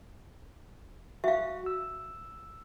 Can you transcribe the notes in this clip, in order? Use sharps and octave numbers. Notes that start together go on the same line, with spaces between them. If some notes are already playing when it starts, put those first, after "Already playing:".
F#4 E5 F5
E6